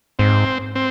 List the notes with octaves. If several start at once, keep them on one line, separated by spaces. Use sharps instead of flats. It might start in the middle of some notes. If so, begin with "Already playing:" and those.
G#2 C4
C4